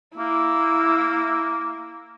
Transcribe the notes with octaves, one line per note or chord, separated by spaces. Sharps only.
A#3 E4